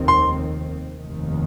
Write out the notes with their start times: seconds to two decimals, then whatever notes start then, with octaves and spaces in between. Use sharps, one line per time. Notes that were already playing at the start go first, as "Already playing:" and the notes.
Already playing: F1 D#2 D#3 C4
0.08 C6
1.00 F1 D#2 D#3